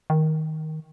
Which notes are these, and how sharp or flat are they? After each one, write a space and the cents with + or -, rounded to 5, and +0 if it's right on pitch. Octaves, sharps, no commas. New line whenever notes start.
D#3 +10